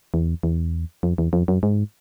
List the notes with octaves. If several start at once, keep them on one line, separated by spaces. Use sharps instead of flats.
E2
E2
F2
E2
F2
F#2
G#2